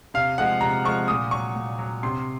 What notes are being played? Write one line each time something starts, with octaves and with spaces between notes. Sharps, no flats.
C3 F5
F3 G#3 F#5
C3 A#5
F3 G#3 C#6
A#2 D#6
F#3 C#6
A#2
F#3
C3 C6